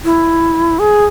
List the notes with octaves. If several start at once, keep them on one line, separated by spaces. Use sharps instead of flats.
E4
G#4